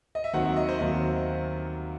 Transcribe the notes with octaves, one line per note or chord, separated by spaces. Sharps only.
D#5
E5
D#2 D#3 F#3 C4 F#5
E5
D#5
C5
D#2 D#3 F#3 C4 D#5